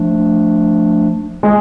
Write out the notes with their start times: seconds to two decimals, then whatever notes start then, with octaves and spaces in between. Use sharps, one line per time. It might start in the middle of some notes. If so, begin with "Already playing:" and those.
Already playing: F3 A3 D4
1.43 G#3